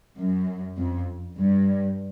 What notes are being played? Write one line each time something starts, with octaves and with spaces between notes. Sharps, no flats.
F#2
F2
G2